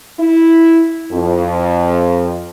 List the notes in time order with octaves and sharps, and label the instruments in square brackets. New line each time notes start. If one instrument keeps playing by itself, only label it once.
[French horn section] E4
F2